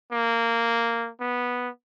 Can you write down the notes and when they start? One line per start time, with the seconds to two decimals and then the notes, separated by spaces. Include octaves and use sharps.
0.12 A#3
1.20 B3